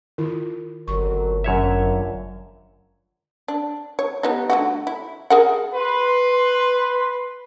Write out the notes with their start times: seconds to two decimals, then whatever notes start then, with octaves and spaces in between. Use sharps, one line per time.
0.18 D#3 E4 F4
0.88 G1 F2 F#3 A#4 C#6
1.44 F#2 D4 F4 A#4 C#5 E5
3.48 D4
3.99 C#5
4.23 G3 B3 D#4
4.50 D3 A3 F#4
4.87 E4
5.30 G#4 A#4 F#5
5.74 B4 C6